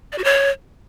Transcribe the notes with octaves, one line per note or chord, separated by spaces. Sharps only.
D5
F#4
C#5